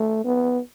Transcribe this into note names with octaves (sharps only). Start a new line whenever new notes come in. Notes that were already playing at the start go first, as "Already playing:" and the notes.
Already playing: A3
B3